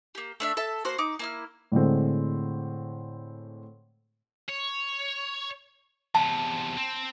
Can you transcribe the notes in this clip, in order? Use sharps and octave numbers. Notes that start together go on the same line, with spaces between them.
A#3 G4
A3 D4 E5
A4 E5 A5
A#3 F#4 C5
D#4 D6
A#3 E4 F6
A2 D3 G#3 C4
C#5
E2 C3 A5
C4